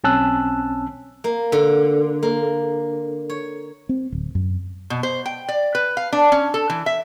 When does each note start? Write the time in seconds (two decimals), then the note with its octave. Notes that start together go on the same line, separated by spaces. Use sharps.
0.04 B1 C4 C#4 A5 E6 F#6
1.24 A#3
1.52 D3
2.23 A#3
3.30 C#5
3.89 C4
4.12 D1
4.35 F#2
4.90 B2
5.03 C5
5.26 G5
5.49 D5
5.75 B4
5.97 F5
6.13 D4
6.32 C#4
6.54 A4
6.70 E3
6.86 E5